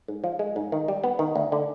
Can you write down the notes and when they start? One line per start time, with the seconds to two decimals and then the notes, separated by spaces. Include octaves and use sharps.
0.08 G#2
0.24 F3
0.39 G#3
0.56 G#2
0.72 D#3
0.88 G3
1.04 B3
1.19 D#3
1.36 D2
1.52 D3